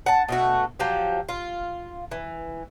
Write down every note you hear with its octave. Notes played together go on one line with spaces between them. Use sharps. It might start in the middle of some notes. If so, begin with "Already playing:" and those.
F#5 A5
B2 A3 F#4
F3 F#3 G4
F4
E3